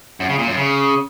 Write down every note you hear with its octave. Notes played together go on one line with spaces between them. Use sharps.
F#2
C#3
A#2
F#2
C#3